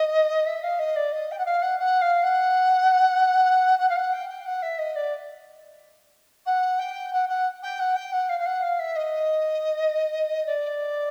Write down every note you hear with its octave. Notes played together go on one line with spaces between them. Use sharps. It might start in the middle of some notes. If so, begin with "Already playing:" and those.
Already playing: D#5
E5
F5
D#5
D5
D#5
G5
F#5
F5
F#5
F#5
F5
F#5
F#5
F5
F#5
G5
G5
F#5
E5
D#5
D5
F#5
G5
F#5
F#5
G5
F#5
G5
F#5
F5
F5
F#5
F5
E5
D#5
D5